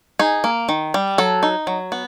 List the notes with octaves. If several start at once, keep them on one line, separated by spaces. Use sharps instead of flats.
D#4 G#4
A#3
D#3
G3
F#3 A4
D#4
F#3
B3